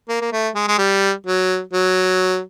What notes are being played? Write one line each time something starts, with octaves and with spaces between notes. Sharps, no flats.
A#3
A#3
A3
G#3
G#3
G3
F#3
F#3